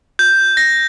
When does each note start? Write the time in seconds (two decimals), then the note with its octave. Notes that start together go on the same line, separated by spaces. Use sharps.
0.19 G6
0.57 A#6